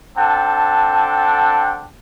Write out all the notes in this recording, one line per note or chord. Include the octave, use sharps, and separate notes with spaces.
C4 D4 A4 F#5 G5 A5